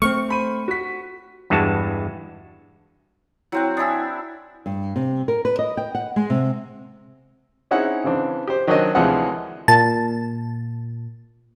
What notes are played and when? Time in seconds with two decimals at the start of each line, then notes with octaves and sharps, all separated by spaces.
0.02 A3 B3 C4 C#6 F6
0.29 C5 B5 D#7
0.68 F#4 B6
1.50 E2 G2 E3 G#3 F#4 A5
3.52 F#3 C4 E4 F#5
3.77 D4 E4 G#5 D#6 E6
4.66 G2
4.96 C3
5.28 A#4
5.45 B4
5.59 D#5
5.77 G5
5.95 F#5
6.16 G#3
6.30 C3
7.71 C4 C#4 D#4 E4 G#4 F#5
8.04 C#3 E3 C4 D4
8.47 G4 C5
8.67 D#3 F#3 C#4 D4 C5 D#5
8.95 D2 C3 E3 F3 G#3 F#5
9.68 A#2 A5